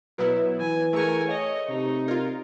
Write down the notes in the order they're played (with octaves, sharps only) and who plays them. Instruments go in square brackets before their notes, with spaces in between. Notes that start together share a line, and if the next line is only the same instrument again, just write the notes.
[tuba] B2 [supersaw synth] F#3 B3 E4 [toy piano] B4 C#5
[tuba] E3 [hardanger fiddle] G#5
[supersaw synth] A3 C#6 [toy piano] G#4 A5 E6 [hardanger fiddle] A#4 G#5
[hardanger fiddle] C#5 D#5
[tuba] C3 [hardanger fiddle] D#4
[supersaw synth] F4 A#4 [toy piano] D5